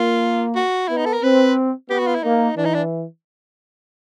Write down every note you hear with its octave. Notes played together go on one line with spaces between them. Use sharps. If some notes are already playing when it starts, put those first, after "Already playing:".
Already playing: A#3 F4
F#4
B3 E4
D#4
A4
A#4
C4 B4
B3 G4
F#4
F4
E4
A#3 D#4
E3 D4
D#4
D4